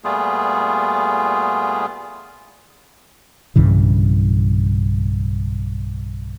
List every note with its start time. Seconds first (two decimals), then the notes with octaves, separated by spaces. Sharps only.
0.04 A#2 G3 A3 B3 F4 G#4
3.56 B1 G2 C#3 E3